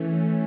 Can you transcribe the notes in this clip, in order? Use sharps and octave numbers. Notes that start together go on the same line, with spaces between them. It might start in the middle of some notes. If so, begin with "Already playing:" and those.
Already playing: E3 A3 C#4